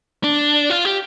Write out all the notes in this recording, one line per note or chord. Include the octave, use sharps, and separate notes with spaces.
D4
F4
G4